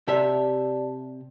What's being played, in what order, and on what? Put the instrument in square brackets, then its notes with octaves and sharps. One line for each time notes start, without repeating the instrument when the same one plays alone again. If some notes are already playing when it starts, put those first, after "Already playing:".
[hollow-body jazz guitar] C3 G4 E5 [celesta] D5 A5